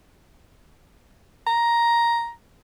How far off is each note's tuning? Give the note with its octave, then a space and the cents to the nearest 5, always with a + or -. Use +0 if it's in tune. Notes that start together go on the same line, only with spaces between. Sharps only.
A#5 +5